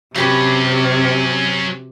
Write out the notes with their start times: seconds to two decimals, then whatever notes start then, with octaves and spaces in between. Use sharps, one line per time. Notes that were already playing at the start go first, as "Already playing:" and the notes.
0.15 C3 F#3 C#4 F#4 G4 B4